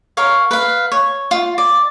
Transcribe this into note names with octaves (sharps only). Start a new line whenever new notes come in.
A#4 C#5 F5
B4 F5
C#5
F4
D5